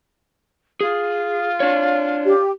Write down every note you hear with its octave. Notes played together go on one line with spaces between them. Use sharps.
F4 G#4
D4 C#5
G4